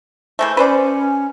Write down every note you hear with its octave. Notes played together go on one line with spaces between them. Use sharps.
E3 G#3 A3 C5
C#4 B4 C5 D5